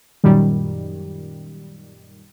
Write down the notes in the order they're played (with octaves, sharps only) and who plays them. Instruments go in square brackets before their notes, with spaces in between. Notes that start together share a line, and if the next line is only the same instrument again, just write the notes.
[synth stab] F#2 A#2 D#3 G3